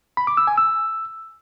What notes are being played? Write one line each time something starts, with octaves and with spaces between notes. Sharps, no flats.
B5
D6
E6
G#5
E6